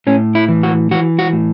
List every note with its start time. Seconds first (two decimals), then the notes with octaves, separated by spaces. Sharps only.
0.07 A2 C#4
0.35 E4
0.49 E3
0.63 F#4
0.91 E3 F#4
1.19 F#4
1.33 A2